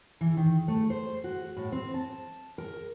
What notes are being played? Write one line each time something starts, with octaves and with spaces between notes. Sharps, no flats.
E3
D#3
A3
C5
F#4
A2
C4
A5
A#4